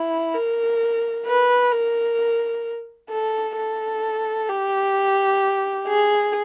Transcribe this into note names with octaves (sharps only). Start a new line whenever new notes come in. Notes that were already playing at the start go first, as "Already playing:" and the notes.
Already playing: E4
A#4
B4
A#4
A4
A4
G4
G#4